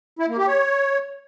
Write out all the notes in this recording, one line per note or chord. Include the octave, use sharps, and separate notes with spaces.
E4
A#3
G4
C#5